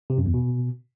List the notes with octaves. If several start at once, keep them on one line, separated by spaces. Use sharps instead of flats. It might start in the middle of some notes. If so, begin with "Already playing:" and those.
C3
F#2
E2
B2